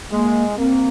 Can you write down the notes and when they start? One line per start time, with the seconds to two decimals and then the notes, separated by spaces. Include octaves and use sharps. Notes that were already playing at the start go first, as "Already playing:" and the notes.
0.11 G#3 A#3
0.57 A#3 C4